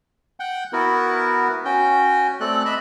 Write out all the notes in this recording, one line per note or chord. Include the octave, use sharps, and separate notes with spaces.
F#5 G5
B3 E4 F#4 A#4 B4
C#4 F#4 G5
A3 C4 A4 D5 F#6
D#5 E5 B5